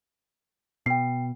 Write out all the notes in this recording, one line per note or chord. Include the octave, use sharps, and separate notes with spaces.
B2 G5 C7